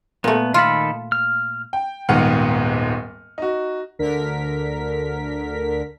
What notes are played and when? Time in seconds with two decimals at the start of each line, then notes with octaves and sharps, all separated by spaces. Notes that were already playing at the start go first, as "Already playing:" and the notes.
0.24 A#2 A3 B3
0.54 D#3 F4 A4 B5
1.12 F6
1.73 G5
2.09 D#1 D#2 G#2 B3 F#5 F6
3.38 D#4 F#4
3.99 D2 D3 A#4 B6